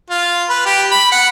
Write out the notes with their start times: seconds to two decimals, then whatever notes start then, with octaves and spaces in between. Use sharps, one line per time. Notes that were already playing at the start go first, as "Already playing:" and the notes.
0.10 F4
0.49 B4
0.65 G4
0.91 B5
1.12 F#5